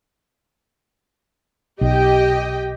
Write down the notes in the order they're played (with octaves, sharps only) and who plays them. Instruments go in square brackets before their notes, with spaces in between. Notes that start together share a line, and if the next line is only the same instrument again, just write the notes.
[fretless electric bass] B1 [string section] G4 D#5 G5